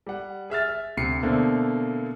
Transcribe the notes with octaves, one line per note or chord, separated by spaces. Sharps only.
G3 F#5
G#4 E5 F6 A6
E5
D2 C3 C7 C#7
B2 D3 A3 A#3 C4